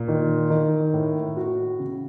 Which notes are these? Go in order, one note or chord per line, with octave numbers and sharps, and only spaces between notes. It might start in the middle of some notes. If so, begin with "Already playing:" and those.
Already playing: A#2
D#3
D#3
A2
F#4
C#3